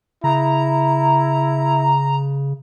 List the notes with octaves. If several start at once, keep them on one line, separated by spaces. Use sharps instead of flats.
C#3 E4 A#5